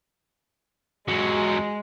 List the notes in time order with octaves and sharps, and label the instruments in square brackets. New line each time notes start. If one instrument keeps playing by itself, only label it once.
[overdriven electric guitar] E2 F#3 [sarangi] G#3